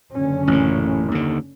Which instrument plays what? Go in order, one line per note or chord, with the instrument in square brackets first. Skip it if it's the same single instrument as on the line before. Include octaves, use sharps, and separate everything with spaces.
[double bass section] F#1 D3 C#4
[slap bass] A1 A#2
D#2 D3